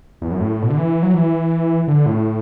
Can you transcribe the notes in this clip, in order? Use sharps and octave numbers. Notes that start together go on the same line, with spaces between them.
E2
F#2
A2
B2
D3
E3
F#3
E3
D3
A2